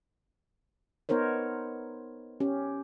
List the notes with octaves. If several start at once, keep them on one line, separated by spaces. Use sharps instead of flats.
B3 D#4 A#4 C5 C#5
C#4 G4